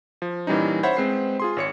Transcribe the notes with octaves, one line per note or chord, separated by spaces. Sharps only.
F3
A#2 E3 G3 C#4 D#4
C5 C#5 E5 F#5 B5
G#3 C4 B4 C5 C7
F4 G#4 C6
G#1 C#5 C#7